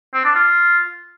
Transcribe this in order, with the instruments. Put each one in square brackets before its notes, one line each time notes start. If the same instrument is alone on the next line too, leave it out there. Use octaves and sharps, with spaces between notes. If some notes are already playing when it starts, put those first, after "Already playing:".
[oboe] C4
D4
F4